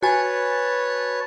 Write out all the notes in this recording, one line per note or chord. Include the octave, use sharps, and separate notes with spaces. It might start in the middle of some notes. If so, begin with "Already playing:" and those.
F#4 B4 C#5 G#5 A5